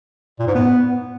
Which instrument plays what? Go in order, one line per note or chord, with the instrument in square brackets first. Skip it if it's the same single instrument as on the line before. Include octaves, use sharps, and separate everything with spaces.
[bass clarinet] A#2
G#2
B3